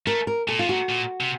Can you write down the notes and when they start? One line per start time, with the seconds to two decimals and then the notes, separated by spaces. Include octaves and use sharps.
0.07 A3 A#4
0.27 A#4
0.48 A#2 A4
0.59 C3 F4
0.69 A#2 F#4
0.89 A#2
1.20 C3